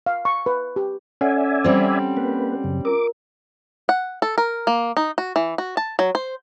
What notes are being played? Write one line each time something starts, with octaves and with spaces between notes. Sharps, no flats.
F5
C#6
B4
G4
C#4 A4 D5 E5 F#5 G#5
G3 C4
A#3 B4
F#2 C#3
F4 A#4 D6
F#5
A4
A#4
A#3
D#4
F#4
E3
F#4
A5
F#3
C5